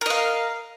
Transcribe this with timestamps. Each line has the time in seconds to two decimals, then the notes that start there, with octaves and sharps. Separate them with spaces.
0.01 A#4
0.06 D#5
0.10 F5